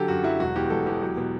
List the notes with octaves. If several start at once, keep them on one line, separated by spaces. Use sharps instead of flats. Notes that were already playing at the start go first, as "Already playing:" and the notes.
Already playing: D3 F#3 G4 A4
F#2 F#4
F#3 E4
E1 F#4
E2 G4
E1 A4
E2 G4
F#3
B2